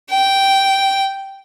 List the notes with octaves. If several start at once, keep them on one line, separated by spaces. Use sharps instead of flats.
G5